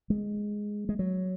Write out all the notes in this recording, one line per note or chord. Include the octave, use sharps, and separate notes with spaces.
G#3
G#3
F#3